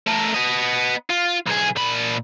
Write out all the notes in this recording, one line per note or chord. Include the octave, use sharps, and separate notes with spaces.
A3 A#4
B3 D#5
F4
B1 G#4
A#2 B5